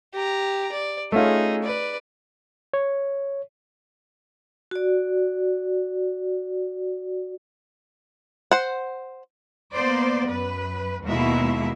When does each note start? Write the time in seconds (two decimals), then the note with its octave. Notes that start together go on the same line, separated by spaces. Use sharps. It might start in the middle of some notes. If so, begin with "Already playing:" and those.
0.14 G4 A#5
0.72 D5
1.12 A3 C#4 D#4 F4 G#4
1.63 B4 D5
2.74 C#5
4.71 F#4 D5
8.51 C5 F#5
9.74 A#3 B3 C5 D5
10.31 F#2 B4
11.06 D#2 B2 G#3 A#3 E4 E5